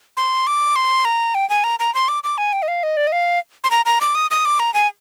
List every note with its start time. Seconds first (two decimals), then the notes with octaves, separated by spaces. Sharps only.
0.17 C6
0.47 D6
0.76 C6
1.05 A#5
1.35 G5
1.50 G#5
1.64 A#5
1.79 A#5
1.95 C6
2.08 D6
2.24 D6
2.38 G#5
2.53 G5
2.62 D#5
2.68 F5
2.83 D#5
2.97 D5
3.07 D#5
3.12 F5
3.64 C6
3.71 A#5
3.86 A#5
4.01 D6
4.15 D#6
4.31 D#6
4.45 D6
4.59 A#5
4.74 G#5